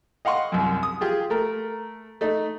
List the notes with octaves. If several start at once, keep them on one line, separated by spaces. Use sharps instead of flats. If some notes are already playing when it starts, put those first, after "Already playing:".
D#5 F5 F#5 C6 C#6
C2 F#2
D#6
F4 G4 G#4
A3 A#4
A3 D#4